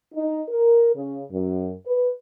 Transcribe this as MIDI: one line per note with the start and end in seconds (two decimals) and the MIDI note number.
0.13 0.41 63
0.48 0.89 70
0.94 1.22 49
1.31 1.72 42
1.86 2.08 71